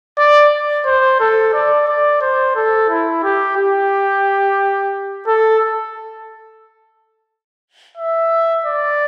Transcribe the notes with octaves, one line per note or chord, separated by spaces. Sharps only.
D5
C5
A4
D5
D5
C5
A4
E4
G4
G4
A4
E5
D5